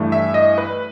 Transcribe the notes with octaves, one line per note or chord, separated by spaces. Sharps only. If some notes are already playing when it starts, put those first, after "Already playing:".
Already playing: G2 E3 A3
E5
D#5
B4